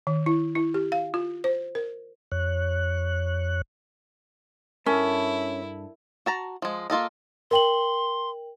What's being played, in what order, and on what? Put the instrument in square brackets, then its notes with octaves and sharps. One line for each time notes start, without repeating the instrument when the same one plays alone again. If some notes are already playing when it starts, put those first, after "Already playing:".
[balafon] D#3
E4
E4
G4
F5
F4
C5
A#4
[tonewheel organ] F2 C#5 F#6
[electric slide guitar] G2 A4 A5 [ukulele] C#4 [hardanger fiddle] E4 [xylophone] A#4
[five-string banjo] F#4 A5 A#5
F3 G#3
A#3 F4 A4 D#5
[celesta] A#4 G5 F#7 [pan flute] C6